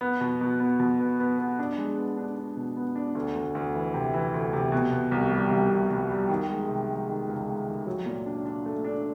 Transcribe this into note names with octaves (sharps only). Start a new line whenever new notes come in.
B3
B2
B2
B3
B2
B3
B3
B3
D4
G#3
B3
D4
D4
B2
B3
D4
D2
D2
D2
E3
C3
E3
D2
C3
B2
B2
C2
G3
C2
C2
C2
G3
D#3
G#3
C3
G#3
D#3
C#2
G#3
D#3
F#3
A#2
D4
D4
A3
D4